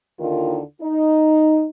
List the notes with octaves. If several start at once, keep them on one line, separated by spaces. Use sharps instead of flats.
D#2 D3 D#3 E4 F4 A#4
D#4